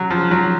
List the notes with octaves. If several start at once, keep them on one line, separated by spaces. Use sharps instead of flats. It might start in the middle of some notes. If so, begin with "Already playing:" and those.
Already playing: F#3
F3
F#3